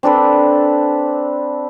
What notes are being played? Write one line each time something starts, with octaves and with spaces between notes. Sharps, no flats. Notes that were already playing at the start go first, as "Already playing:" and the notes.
C4 D4 A4 B4